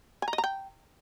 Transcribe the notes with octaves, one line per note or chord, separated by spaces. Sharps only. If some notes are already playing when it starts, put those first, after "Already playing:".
G#5
A#5
D#5
A#5
G5